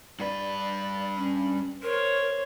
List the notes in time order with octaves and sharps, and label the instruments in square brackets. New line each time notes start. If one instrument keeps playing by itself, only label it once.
[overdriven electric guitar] G2 B4 [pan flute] D5
[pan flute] C#4
[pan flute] A#4 [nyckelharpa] C5 C#5